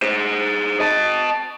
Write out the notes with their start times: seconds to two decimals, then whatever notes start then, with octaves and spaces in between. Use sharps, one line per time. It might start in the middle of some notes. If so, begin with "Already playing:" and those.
0.02 G#4 C5
0.80 D#5 A5